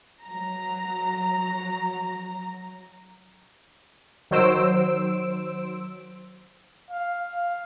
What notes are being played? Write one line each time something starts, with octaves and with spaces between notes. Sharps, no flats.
F#3 A#5
D#3 F#3 C5 E6 D7
F5
F5